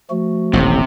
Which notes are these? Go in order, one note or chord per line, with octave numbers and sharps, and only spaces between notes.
F3 A3 F#4
D#1 A1 C3